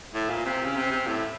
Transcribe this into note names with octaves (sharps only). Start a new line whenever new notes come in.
A2
A#2
C3
C#3
C3
C3
A2